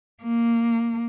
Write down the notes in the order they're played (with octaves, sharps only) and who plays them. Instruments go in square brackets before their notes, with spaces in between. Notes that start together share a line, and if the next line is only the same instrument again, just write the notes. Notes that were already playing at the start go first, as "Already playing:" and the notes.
[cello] A#3